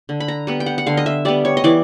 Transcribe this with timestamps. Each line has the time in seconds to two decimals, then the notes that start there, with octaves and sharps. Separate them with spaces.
0.09 D3
0.20 B5
0.28 A#5
0.47 G3 B3
0.60 G5
0.66 F#5
0.78 F#5
0.86 D3 F5
0.97 D#5
1.06 E5
1.25 G3 B3 D5
1.45 C#5
1.57 D#5
1.64 E3 D5